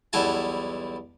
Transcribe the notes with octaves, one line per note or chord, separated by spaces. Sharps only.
B1 E2 G3 E4 G#5 A5